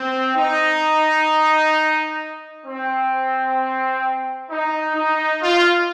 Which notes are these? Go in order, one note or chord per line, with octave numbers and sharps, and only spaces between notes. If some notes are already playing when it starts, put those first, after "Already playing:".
Already playing: C4
D#4
C4
D#4
D#4
F4